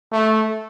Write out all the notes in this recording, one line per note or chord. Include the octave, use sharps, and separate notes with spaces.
A3